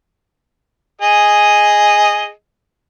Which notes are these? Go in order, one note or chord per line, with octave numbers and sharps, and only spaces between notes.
G#4 D#5